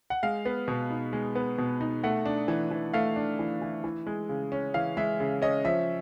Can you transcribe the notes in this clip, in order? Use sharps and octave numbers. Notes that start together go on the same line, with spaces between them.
F#5
G#3 F5
B3
B2
D#4
G#3
B3
B2
D#4
A3 F#5
D4
E3
E3
A3 F5
D4
E3
E3
E3
G#3
C#3
C#4
E3 F5
G#3 E5
C#3
C#4 D#5
F3 E5